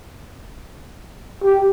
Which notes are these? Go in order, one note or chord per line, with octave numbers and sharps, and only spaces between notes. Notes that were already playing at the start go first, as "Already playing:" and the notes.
G4